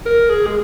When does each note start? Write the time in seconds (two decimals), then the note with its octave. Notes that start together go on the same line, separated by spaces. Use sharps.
0.06 A#4
0.30 G#4
0.46 G#3